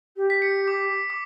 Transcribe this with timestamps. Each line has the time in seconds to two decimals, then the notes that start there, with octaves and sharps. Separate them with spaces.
0.16 G4
0.30 B6
0.42 C#7
0.68 D6
1.10 D6